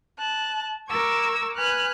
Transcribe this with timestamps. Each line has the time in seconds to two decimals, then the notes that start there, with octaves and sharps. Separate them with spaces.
0.18 A5 F#6
0.89 A#4 C#6 D6 E6 G#6
1.57 B4 G#5 F6 F#6